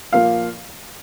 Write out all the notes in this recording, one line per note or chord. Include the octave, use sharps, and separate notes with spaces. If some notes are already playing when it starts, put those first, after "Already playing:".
A#2 F3 A#3 F5